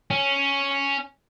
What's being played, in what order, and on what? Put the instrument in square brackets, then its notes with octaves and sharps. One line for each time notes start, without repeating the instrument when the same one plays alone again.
[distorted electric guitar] C#4